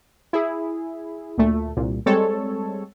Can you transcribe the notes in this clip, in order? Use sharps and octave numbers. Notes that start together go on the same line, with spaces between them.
E4 G#4
D2 A#2 A3
C2 A#2
G3 G#3 C4 A4 C#5